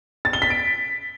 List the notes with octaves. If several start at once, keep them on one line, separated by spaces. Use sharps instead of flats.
A6
G7
B6
D7